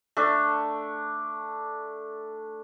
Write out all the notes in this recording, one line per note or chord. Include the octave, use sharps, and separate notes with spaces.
A3 D4